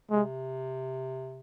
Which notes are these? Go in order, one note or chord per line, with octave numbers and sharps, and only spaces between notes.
C3 G#3